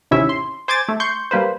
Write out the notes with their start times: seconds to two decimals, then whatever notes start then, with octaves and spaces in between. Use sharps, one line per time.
0.11 A1 D#2 C3 C#4 E4 E5
0.29 C6
0.68 C5 G#5 D6 G#6 A6
0.88 A3
1.00 C6 C#6 G6
1.31 G3 A#3 B4 C5